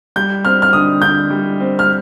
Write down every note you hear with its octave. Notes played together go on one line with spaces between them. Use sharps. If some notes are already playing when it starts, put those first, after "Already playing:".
G3 G6
C4 F6
F6
D3 D#6
D3 G6
G3
C4
F6